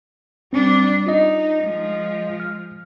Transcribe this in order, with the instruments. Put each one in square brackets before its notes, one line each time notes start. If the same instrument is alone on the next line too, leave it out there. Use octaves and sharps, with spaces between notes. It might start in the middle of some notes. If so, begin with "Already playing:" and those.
[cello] G3 D4 [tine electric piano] C4
[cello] D#4 [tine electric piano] F4 D#5
[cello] F3 G#3
[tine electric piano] F6